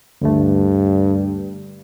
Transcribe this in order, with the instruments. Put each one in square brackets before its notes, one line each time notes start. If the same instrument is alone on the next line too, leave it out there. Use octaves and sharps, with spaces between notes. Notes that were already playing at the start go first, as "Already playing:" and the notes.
[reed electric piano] D2 D3 A3 [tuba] G2